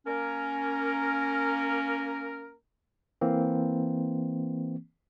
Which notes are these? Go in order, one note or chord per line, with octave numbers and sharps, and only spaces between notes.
A#3 C#4 A#4
E3 A#3 C4